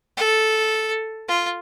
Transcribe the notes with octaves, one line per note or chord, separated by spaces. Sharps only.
A4
F4